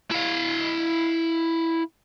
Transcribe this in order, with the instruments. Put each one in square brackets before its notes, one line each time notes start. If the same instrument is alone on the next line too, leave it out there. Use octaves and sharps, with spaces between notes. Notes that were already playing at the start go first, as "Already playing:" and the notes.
[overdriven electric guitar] E4 F5